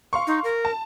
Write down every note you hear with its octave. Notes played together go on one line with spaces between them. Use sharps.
F5 C6 C#6
D#4
A#4
A5